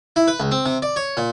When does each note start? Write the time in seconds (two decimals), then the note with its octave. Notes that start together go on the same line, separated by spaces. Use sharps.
0.16 E4
0.28 B4
0.40 C#2
0.51 C4
0.66 C3
0.82 D5
0.96 C#5
1.17 A#2